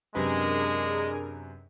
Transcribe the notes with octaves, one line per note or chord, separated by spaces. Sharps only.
F#2 C3 G#3 D4 G#4 A#4 B4